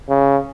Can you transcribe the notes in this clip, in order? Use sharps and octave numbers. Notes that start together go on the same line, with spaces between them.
C#3